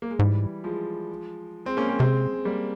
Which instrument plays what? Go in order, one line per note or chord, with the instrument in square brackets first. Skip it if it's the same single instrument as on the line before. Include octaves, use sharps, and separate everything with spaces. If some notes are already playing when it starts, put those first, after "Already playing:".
[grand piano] A#3
G#3
[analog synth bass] G#2 [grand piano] E3 G3
[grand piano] F3 G#3
G#3 C4
A#3 C#4
G#3 C4
[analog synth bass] C3 [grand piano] G#3 C4
[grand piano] G#3
G3 A#3